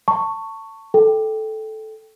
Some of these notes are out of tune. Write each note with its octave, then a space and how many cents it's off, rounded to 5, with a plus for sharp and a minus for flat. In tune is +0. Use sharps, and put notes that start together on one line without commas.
A5 +25 C#6 +0
A4 -10 G5 +0